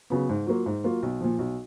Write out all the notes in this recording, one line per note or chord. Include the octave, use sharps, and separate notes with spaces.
C#3 F#3 B3
G#2
F#3 A#3 F4
G#2
F#3 A#3 F4
B1
A#2 F3
B1